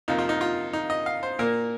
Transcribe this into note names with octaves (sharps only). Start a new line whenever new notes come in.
F2 C3 F3 A#3 D#4
F4
D#4
F4
D#4
D#5
F5
C5
A#2 A#3 A#4